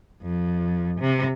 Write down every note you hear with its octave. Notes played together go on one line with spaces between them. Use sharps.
F2
C3